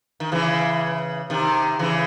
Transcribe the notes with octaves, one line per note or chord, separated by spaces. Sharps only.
D#3
C#3 E3
C3 D#3
C#3 E3